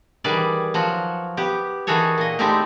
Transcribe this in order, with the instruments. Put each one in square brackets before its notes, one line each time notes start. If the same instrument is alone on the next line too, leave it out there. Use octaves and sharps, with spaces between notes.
[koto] D#3 E3 G3 G#4 B4 D5
F3 F#3 F#4
B3 G4
D#3 E3 F#4 G#4 A4 C#5
A#2 D#5
G#3 A3 C4 D#4 E4 G4